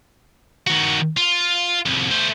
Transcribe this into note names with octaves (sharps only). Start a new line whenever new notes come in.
D#3 F#4
F4
C2 F2
A3 C5